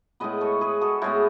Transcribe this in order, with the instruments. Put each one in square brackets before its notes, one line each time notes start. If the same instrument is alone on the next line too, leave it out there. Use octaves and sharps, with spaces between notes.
[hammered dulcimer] A2 G#3 B3 B4 D#5
A4 C#5
G#4 B4
F#4 A4
A2 G#3 B3 E4 G#4